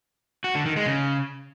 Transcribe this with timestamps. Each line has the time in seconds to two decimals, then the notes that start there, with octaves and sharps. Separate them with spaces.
0.44 F#4
0.55 D3
0.66 D#3
0.76 G#3
0.87 C#3